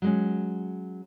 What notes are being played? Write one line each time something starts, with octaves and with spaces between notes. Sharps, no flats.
F#3 G#3 C#4